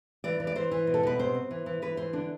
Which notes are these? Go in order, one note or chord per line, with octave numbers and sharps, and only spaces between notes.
E3 D5
E3
D5
E3 C5
E3
B2
A4
B2 B4
C3 C5
C4
E3
E3
E3 B4
E3 C5
D3 D4